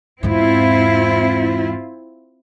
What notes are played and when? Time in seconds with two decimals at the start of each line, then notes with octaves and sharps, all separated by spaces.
0.23 E2 G#2 C4 E4 F4